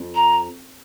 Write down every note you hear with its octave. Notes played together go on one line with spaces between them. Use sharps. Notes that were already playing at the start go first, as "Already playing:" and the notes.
Already playing: F2
A#5